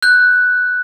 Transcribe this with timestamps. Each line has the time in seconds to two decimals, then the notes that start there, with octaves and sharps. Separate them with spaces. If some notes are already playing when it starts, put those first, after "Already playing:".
0.03 F#6 G6